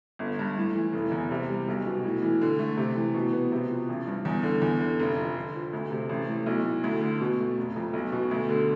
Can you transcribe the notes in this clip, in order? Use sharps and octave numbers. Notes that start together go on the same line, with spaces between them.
G1
G2
A2
E3
F1
E2
C3
G3
B1
B2
A2
E3
D3
A3
C3
E3
B2
B3
C3
F3
A1
G2
E2
D3
E2
D3
F1
F2
D3
F3
D2
C3
A1
A2
B1
A2
D2
D3
B2
A3
F1
F2
B1
B2
D2
D3